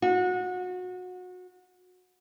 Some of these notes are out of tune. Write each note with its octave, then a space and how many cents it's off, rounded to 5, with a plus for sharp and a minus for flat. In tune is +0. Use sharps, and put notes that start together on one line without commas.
F#4 -25